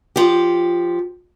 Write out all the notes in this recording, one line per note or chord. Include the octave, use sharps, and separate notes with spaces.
F3 G4